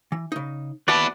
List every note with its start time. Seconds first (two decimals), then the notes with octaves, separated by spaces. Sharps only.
0.12 E3
0.32 C#3 D#4
0.88 D#2 B3 E4 F#4 B4 D5 A5